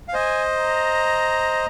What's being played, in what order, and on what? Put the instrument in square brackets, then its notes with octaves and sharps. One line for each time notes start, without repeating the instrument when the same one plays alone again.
[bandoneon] F5
[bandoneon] C5 D#5 [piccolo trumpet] G#5
[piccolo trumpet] A#5